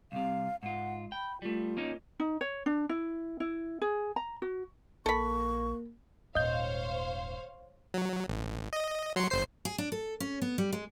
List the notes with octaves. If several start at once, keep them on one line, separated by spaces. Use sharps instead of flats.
C2 C3 F5
G#2 F4 F#5
G5 B5
G3 A3 F4
A#3 C#4 D#4
D#4
C#5
D4
E4
E4
G#4
A#5
F#4
A#1 A#3 A4 B5 C#6
D#1 G#2 C5 C#5 D#5 F5 G6
F#3
A1
D#5
F#3 C6 C#7
G1 C5 C7
G#4
D4
A4
C#4
B3
G3
G#3